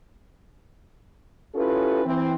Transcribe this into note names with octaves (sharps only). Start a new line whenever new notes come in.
C#4 E4 F4 G4 A4 B4
E3 C4